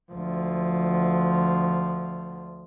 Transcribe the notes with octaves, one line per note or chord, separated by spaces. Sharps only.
D2 F3